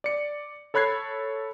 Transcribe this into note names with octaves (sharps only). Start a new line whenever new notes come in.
D5 C#7
A4 C#5 B5 F#6 G#6 C7